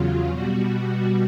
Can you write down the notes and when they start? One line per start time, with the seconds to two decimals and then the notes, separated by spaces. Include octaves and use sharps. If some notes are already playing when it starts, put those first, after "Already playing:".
Already playing: E2 C#3 F#3 F4
0.28 B2 G3 F#4